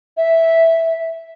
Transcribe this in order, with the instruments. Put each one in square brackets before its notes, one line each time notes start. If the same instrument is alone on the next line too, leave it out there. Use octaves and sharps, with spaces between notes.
[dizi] E5